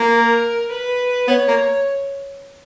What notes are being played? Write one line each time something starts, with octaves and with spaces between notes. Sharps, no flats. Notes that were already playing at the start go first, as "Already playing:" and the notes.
Already playing: A#3
A#4
B4
B3 C#5
A#3